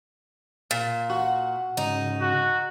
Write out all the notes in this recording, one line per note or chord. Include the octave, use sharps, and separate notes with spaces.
A#2
F#4
G#2 C#3 D#4
F#4